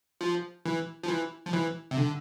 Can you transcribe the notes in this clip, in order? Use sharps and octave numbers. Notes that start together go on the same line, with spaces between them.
F3
E3
F3
E3
F3
E3
C3
D3